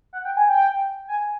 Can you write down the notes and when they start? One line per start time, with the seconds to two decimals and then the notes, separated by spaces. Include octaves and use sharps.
0.13 F#5
0.25 G5
0.37 G#5
0.49 G5
1.08 G#5